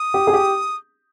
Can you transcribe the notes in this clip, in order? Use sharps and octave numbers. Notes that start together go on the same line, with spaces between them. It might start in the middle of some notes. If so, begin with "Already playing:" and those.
Already playing: D#6
G4
G#4
G4